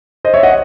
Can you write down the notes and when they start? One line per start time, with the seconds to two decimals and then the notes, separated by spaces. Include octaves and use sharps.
0.25 C5 D#5
0.34 C#5 E5
0.43 D#5 F#5